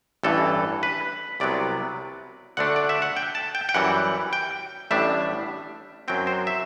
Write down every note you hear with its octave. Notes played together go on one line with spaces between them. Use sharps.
A1 G2 E3 A4
B4
C2 C3 F#3 B3 D5
D2 D3 A3 D4 F#5
D5
E5
F#5
G5
A5
G5
G5
F#2 E3 G3 F#5
G5
A1 A2 G3 D4 E5
F#2 F#3 C4 G5
C5
E5